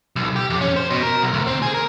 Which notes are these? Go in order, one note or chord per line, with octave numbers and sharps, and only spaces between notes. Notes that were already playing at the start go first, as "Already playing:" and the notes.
B1
G4
F2
C#4
C5
B2
A#4
B1
D2
C4
G#4
A#4